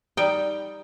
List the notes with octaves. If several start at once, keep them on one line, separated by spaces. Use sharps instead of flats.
G3 D#4 G5